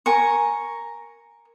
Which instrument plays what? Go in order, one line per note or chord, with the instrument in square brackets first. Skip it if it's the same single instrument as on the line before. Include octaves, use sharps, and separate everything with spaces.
[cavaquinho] A#4 G#5 A#5 C#6